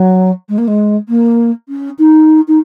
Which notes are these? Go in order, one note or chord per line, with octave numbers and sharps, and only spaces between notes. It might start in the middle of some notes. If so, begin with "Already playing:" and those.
Already playing: F#3
G#3
A#3
G#3
A#3
C#4
D#4
D#4